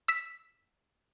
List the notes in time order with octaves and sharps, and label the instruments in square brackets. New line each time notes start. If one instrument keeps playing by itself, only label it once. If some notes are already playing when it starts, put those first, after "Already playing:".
[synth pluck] E6 B6